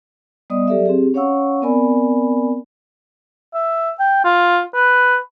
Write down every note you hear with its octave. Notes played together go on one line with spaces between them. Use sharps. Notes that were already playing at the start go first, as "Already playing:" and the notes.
G3 B3 D5 D#5 D#6
F#3 G4 A4 D5 E5
C4 G4 G#4
C#4 C#5 F5 F#5 C#6 E6
B3 C4 A#4 D5 G#5 B5
E5
G5
F4
B4